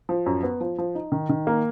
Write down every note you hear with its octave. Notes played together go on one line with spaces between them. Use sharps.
F3
F#2
B3
F3
F3
D#4
D#3
D#3
A#3